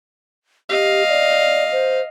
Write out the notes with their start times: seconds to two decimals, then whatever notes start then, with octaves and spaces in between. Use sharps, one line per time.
0.70 G4 D#5 F5
1.09 D5
1.72 C5